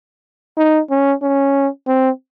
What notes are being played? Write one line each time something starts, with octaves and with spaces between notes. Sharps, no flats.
D#4
C#4
C#4
C4